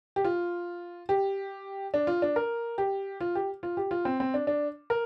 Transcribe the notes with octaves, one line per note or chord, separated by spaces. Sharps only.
G4
F4
G4
D4
F4
D4
A#4
G4
F4
G4
F4
G4
F4
C4
C4
D4
D4
A#4